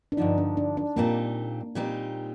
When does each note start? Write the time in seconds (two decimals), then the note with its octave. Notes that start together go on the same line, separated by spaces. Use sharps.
0.12 D4
0.17 G2 D3 F3 D#4
0.38 D4
0.57 D4
0.77 D4
0.96 A#2 G3 A#3 C4 D#4
1.75 A#2 G3 C4 D#4